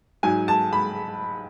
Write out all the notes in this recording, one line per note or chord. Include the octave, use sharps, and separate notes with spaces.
G#2 F#3 G#5
A5
B5